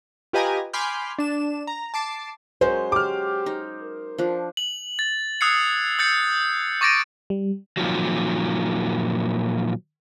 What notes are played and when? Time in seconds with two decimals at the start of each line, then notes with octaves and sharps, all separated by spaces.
0.33 F4 G4 B4 D#5 G#5 A#5
0.73 G#5 B5 C6 D6 F6 G6
1.19 D4 E7
1.67 A#5
1.94 A5 D6 C7
2.61 F#3 G#3 C#4 A#4 C5
2.92 G4 D6 F6
3.46 D#4
3.82 A#4
4.18 F3 D4
4.57 F#7
4.99 A6
5.41 D#6 E6 F#6 G#6 C7 C#7
5.99 E6 G6 A6 C#7
6.81 C#6 D6 A6 A#6 D7 D#7
7.30 G3
7.77 A#2 D#3 F3 F#3